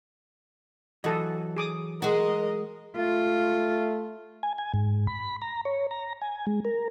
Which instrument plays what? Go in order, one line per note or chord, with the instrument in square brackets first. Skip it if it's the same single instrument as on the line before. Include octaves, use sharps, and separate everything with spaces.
[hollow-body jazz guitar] E3 F#3 [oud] F#4 [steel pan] A4 D#5
[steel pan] G#4 D6 D#6
[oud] G#3 F#4 [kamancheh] A#4 D#5
[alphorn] A3 [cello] F4
[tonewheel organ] G#5
G#5
G#2
B5
A#5
C#5
A#5
G#5
G#3
A#4